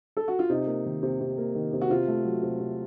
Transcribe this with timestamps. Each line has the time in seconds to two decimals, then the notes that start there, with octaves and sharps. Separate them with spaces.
0.17 A4
0.28 F#4
0.39 F4
0.50 C3 D#4
0.67 A#3
0.86 D#3
1.03 C3
1.21 C3
1.38 A#3
1.55 D#3
1.73 C3
1.81 F#4
1.90 C3 F4
2.07 A3
2.25 F#3
2.43 C3
2.60 C3